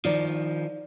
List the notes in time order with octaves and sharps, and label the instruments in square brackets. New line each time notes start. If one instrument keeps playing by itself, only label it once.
[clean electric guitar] D#3 F3 [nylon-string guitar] D5